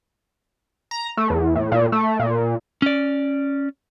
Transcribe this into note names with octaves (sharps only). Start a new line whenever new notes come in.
A#5
A3
E2
A2
A#2
A3
A#2
C#4 D5